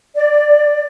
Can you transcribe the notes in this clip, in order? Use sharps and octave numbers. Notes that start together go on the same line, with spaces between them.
D5